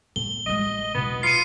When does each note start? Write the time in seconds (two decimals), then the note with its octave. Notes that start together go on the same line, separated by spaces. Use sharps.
0.16 A2 G7
0.46 A1 G#3 D#5
0.95 E1 B1 B3
1.23 F4 C7 C#7 D#7